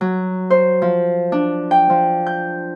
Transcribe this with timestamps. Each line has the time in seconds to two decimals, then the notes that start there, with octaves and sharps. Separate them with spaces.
0.01 F#3
0.50 C5
0.82 F3
1.32 D4
1.71 G5
1.90 F3
2.27 G6